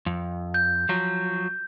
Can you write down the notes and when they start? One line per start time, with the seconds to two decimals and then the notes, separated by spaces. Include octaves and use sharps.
0.06 F2
0.54 G6
0.89 F3 F#3